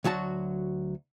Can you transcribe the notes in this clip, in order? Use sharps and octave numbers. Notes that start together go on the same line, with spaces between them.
D2 F#3 F#4 A5